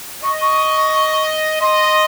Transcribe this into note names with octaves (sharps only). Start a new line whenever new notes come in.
D#5 C#6
C#6
D#5 C6